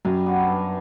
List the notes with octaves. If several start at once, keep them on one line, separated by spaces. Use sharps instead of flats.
F#2 F#3 G3
B3 D4 F#4
G2